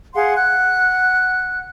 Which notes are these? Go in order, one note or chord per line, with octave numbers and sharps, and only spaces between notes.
G#4 F5 F#5 C6
F#5 F#6